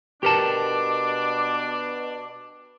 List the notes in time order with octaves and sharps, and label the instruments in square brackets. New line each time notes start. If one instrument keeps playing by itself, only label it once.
[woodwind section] B2 D4 D6 [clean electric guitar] G4 A#4 A5